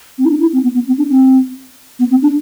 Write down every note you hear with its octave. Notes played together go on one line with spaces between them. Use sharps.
C4
E4
D4
E4
C4
B3
B3
C4
D4
C4
B3
C4
D4